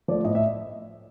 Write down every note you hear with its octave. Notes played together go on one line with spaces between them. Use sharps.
F3 A3 D5
A2 D#5
E5